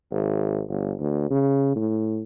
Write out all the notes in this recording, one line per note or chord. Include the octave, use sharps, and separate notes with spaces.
G#1
G1
D2
C#3
A2